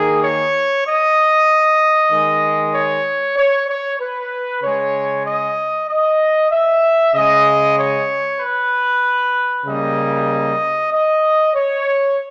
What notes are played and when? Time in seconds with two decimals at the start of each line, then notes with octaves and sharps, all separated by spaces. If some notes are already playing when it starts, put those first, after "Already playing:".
Already playing: D#3 A#3 G#4
0.23 C#5
0.85 D#5
2.11 D#3 G#3
2.74 C#5
3.37 C#5
3.68 C#5
4.00 B4
4.62 C#3 G#3 C#5
5.25 D#5
5.88 D#5
6.51 E5
7.14 C#3 G#3 D#5
7.77 C#5
8.39 B4
9.65 C#3 G3 A#3 D#5
10.91 D#5
11.54 C#5